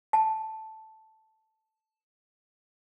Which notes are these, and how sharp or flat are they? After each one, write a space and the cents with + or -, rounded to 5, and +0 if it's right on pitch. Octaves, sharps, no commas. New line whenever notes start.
A5 -5